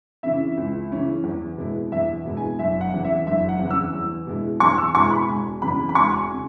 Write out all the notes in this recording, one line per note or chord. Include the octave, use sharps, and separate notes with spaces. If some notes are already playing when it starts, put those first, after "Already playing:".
C#3 E3 C#4 E4 E5
C#2
C#3 E3 C#4 E4
E2
B2 G#3 B3 E4
E2 E5
B2 G#3 B3 E4
G#5
F#1 E5
F#5
E2 C#3 E3
E5
F#1 E5
F#5
E2 C#3 E3
E6
E2
B2 G#3 E4
E2 C#6
E6
B2 G#3 E4 C#6
B5
E1 G#5
E2 C#3 B5
B5
E1 C#6
G#5
C#3